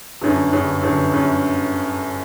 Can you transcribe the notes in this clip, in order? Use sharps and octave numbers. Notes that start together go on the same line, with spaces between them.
G1 F#2 D3
G1 F#2 D3
G1 F#2 D3
G1 F#2 D3